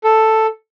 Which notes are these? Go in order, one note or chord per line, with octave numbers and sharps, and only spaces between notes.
A4